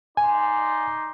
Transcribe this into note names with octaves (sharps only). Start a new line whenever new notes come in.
D#4 D5 G#5 C6